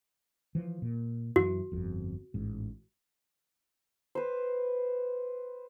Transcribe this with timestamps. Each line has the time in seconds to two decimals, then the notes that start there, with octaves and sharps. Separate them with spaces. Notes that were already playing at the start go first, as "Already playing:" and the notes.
0.55 E3 F3
0.82 A#2
1.36 F#2 E3 F#4
1.72 G1 F2
2.34 A1 G#2
4.15 B4 C5